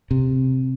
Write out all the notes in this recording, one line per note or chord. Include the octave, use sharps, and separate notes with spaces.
C3